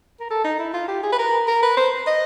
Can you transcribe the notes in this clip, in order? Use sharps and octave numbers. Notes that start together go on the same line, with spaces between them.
A#4
A4
D#4
E4
F4
G4
G#4
B4
A#4
A#4
B4
C5
D#5